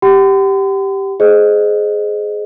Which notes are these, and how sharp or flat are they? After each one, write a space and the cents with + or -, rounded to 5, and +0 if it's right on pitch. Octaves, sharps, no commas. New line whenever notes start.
G4 +0 F#5 +40 C6 -45
G#4 +20 C5 +0 D#5 -20